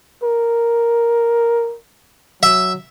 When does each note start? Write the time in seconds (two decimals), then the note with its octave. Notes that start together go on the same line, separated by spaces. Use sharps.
0.23 A#4
2.43 F#3 E5